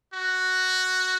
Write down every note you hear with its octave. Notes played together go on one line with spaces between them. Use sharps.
F#4